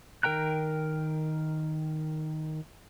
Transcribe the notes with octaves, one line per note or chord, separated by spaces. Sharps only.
D#3 A#4 G5 A#5 F#6